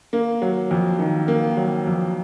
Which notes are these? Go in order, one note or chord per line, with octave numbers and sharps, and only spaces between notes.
A#3
F#3
F2
D#3
A#3
F#3
F2